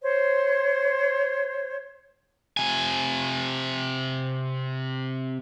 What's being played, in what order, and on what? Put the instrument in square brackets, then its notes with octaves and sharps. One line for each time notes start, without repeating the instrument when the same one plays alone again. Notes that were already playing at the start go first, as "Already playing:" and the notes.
[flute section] C5 C#5
[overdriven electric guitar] C3 G#5